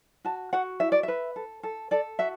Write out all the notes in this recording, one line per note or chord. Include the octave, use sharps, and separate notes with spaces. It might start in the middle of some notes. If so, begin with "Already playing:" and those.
F#4 A5
F#4 F#5
E4 E5
D5
B4 E5
A4
A4
A4 D5
F#4 E5